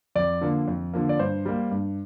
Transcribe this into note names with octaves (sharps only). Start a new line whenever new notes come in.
F2 D5
D3 F3 A#3
F2
D3 F3 A#3
D5
G2 C5
G3 A#3
G2